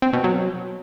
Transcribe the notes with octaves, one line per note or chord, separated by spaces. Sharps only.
C4
B2
F#3